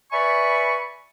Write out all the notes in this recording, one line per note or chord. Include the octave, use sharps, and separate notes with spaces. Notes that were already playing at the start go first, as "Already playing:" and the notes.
B4 D5 E5 G#5 B5 C#6